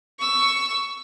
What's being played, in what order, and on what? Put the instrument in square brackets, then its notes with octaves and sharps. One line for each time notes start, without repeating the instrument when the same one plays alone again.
[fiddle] C#6 E6